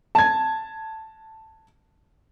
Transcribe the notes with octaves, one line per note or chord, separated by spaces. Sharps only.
A5 G#6